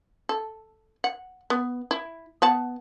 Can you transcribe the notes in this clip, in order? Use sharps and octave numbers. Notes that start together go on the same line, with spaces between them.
A4
F#5
B3
E4
B3 F#5 A5